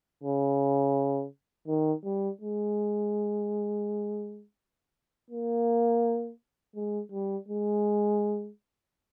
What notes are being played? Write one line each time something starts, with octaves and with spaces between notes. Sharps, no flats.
C#3
D#3
G3
G#3
A#3
G#3
G3
G#3